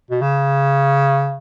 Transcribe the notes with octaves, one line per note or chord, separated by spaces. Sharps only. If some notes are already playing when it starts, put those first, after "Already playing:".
B2
C#3